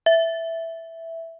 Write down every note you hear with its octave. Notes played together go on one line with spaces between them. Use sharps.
E5